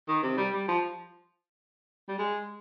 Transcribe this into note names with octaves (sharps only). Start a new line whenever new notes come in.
D#3
C3
G3
G3
F3
G3
G#3